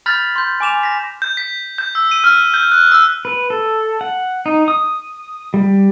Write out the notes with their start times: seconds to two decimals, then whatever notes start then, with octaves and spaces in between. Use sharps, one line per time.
0.06 B5 F6 G6 A6 B6 F#7
0.36 C6 G6
0.60 G#5 D6 E7 F7
0.83 A#6 B6
1.22 G6
1.37 B6
1.78 G6
1.95 E6
2.11 D#7
2.24 F6
2.54 G6
2.72 F#6
2.92 E6
3.25 B4
3.50 A4
4.01 F#5
4.46 D#4
4.68 D#6
5.54 G3